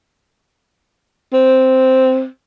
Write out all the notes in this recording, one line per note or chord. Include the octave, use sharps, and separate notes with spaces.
C4